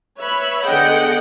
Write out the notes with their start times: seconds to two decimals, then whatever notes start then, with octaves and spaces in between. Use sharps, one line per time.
0.19 B4 C#5 E5 B5
0.64 D3 B3 G#4 D#5 F#5 G5